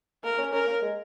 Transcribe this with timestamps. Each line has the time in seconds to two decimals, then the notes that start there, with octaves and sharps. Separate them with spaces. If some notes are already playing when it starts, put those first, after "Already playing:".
0.24 A#3 A#4
0.38 C#4
0.53 C#4 A#4
0.67 A#3
0.82 G#3